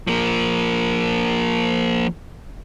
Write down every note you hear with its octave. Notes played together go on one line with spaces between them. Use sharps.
F3 A#3